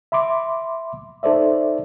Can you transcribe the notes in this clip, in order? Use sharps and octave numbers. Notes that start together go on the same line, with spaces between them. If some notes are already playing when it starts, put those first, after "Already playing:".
E5 B5 C6 D6
D#4 A4 C5 D5 E5